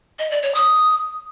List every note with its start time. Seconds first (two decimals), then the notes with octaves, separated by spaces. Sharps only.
0.19 D#5
0.31 D5
0.43 C#5
0.55 D#6